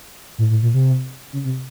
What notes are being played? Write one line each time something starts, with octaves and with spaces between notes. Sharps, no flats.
A2
A2
A#2
C3
C#3
C3